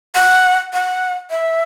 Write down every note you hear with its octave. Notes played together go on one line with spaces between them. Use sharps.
F#5
F#5
E5